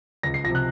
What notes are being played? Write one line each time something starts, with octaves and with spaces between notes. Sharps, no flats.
C#2 A#6
C7
C3 F3 A#6
F#6